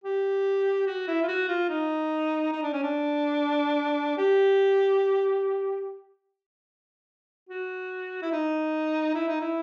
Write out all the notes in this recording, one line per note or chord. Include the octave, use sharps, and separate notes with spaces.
G4
F#4
E4
F4
F#4
F4
D#4
D#4
D4
C#4
D4
G4
F#4
E4
D#4
E4
D#4
E4